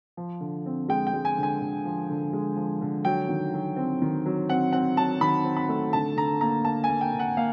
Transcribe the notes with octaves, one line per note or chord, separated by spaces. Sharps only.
F3
D3
C4
G#3 G5
G5
G#3
G#5
D3
G#5
D3
F3
D3
G#3
F3
D3
F#3 G5
D#3
F#3
C4
D#3
F#3
C4 F#5
C4 F#5
F#3 A5
D#3 B5
C4
B5
A3
D3 A5
D3 A#5
A#3 A#5
A#3 A5
G#5
A#3
G5
D3
F#5
A#3 F5